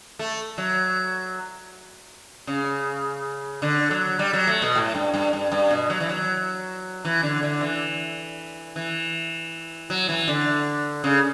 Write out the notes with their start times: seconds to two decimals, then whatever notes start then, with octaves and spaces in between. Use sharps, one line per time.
0.19 A3
0.58 F#3
2.47 C#3
3.62 D3
3.90 F#3
4.19 G3
4.33 F#3
4.47 A3
4.62 B2
4.75 A2
4.95 G2
5.14 G2
5.33 G2
5.51 G2
5.71 B2
5.90 F#3
6.00 E3
6.09 F#3
7.05 E3
7.23 D3
7.43 D3
7.61 E3
8.76 E3
9.90 F#3
10.09 E3
10.28 D3
11.04 C#3